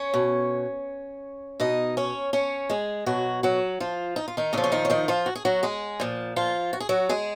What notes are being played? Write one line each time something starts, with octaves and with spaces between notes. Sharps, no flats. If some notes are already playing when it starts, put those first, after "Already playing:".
Already playing: C#4 C#5
B2
B2 D#4 D#5
C#4 C#5
C#4 C#5
G#3 G#4
B2 F#3 F#4
F#3 F#4
F3 F4
D#4
F4
D#3 D#4
A#2 C#3 F3 C#4
C#4
D#3 D#4
C#4
D#3 D#4
F3 F4
F#4
G#4
F#3 F#4
G#3 G#4
A#2 F3
F3 F4
F#4
G#4
F#3 F#4
G#3 G#4